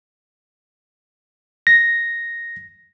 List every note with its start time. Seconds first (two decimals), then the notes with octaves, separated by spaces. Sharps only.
1.67 A#6